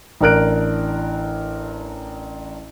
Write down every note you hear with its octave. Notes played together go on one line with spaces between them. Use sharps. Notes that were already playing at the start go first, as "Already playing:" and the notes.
A1 D4 A#4 F#6 D7